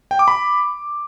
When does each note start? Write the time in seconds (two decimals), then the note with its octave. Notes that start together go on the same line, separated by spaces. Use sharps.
0.11 G5
0.19 D6
0.28 B5